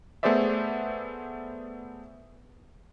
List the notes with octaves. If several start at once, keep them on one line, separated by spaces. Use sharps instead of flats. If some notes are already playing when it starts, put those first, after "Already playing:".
A3 B3 G#4 C5 D5 E5